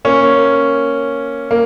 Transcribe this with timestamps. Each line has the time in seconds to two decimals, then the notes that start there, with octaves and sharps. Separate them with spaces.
0.05 A#3 C#4
1.51 A#3